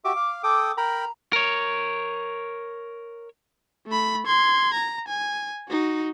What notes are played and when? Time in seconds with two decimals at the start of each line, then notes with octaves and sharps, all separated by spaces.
0.05 F#4 G4 E5 D6
0.16 F5
0.43 A4 G5 D6 D#6
0.77 A#4 G5 A#5 B5
1.33 A#4 C#5
3.87 A3 B5
4.26 C6 G#6
4.74 A#5
5.08 G#5
5.69 D#4 F#4